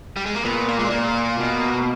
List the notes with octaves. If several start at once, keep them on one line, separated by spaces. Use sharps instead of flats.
G3
G#3
A#3
A#2 B3
A#3
G#3
A#2 A#3
B2